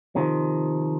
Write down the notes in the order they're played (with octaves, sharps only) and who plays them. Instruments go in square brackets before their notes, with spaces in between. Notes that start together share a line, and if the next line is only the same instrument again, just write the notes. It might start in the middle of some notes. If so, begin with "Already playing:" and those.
[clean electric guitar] C3 D#3 F3